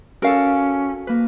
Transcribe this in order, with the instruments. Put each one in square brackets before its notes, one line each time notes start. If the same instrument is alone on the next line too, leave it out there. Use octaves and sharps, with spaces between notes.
[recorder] C#4 [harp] F#4 A4 [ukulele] A#4 F5
[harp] A#3 B4